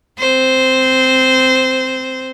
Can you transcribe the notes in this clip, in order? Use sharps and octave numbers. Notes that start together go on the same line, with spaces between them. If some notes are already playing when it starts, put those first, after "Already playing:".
C4 C5